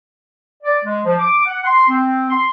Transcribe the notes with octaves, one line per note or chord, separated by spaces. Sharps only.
D5
G#3
F3
D6
F#5
C6
C4
C6